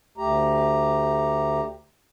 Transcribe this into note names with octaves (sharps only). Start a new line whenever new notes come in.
D2 A3 G4 A#5